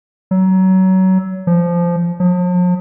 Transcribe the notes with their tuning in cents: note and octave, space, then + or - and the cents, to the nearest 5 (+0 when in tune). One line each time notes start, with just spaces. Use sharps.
F#3 +25
F3 -15
F3 +45